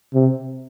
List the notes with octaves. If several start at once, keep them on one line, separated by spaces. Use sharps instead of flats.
C3